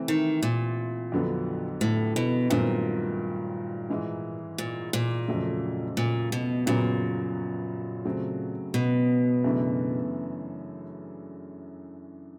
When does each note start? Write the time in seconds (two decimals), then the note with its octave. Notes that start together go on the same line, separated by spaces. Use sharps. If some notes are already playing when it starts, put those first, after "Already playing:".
Already playing: C3 E3 A3 C4
0.08 D#3
0.43 A#2
1.12 F2 D3 F#3 B3 D4
1.81 A2
2.16 B2
2.50 G2 A#2 D#3 F#3 A3 C4
3.90 G#2 E3 G#3
4.58 A#2
4.93 A#2
5.28 F2 C#3 F#3 A3
5.97 A#2
6.32 B2
6.66 F#2 A#2 C#3 F#3 B3
8.05 C#3 F#3 A3 C4
8.74 B2
9.44 F#2 C#3 E3 A3 D4